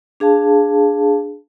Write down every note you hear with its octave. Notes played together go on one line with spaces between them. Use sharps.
D4 G#4 F5 A5